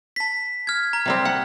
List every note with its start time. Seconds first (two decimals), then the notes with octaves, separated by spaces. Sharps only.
0.16 A5 B6
0.67 F6 G#6
0.93 A#5
1.06 C3 G3 C4
1.25 F#5